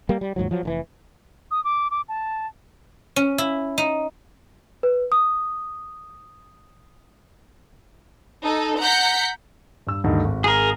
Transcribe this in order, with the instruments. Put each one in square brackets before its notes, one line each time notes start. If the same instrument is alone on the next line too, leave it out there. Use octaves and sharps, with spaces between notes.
[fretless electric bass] G3 A#3
G3
D#2 G#2 F3 F#3
F3 F#3
F1 A2 E3
[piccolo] D#6
D6
D6
A5
[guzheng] C#4
E4
D#4
[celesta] B4
D#6
[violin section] D#4 A4
F#5 A#5 G6 B6 C#7
[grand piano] G2 E6
D2 G2 D#3
G#1
[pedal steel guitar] G#4 A#4